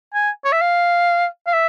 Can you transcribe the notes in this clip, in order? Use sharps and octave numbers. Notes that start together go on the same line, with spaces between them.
G#5
C#5
E5
F5
F5
E5